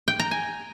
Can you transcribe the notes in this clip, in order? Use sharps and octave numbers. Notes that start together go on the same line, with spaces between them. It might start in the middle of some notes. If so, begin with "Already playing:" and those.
G5
A#5
G#5